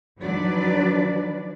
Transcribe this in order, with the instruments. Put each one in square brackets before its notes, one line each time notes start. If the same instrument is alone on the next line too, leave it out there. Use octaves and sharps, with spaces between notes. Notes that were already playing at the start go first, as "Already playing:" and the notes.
[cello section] D#3 F3 F#3 D4 B4 D5